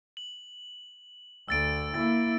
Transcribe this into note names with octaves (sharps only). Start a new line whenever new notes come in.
F#7
D2 E6 A6 D7
A#3 E4 A6